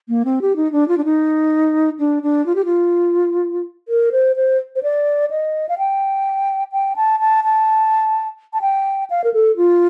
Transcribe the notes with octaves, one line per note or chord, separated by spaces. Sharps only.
A#3
C4
G4
D#4
D4
F4
D4
D#4
D4
D4
F4
G4
F4
A#4
C5
C5
C5
D5
D#5
F5
G5
G5
A5
A5
A5
A5
G5
F5
A#4
A4
F4